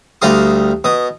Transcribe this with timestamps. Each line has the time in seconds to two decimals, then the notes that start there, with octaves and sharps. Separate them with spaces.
0.22 D2 G3 F5 A#5 C6 D#6
0.84 B2 D#6